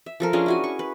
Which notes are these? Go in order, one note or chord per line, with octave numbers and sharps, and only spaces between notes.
E5
F3 A4 A#4
C#4 D4 F4 G#4
E4 F#4 G#5
C#6
B4